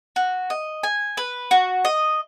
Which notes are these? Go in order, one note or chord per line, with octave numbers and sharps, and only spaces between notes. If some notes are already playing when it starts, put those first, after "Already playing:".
F#4
D#5
G#5
B4
F#4
D#5